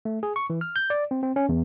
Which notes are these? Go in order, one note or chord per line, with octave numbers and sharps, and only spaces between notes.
A3
G#4
C#6
E3
F6
G6
D5
C4
C4
C#4
E2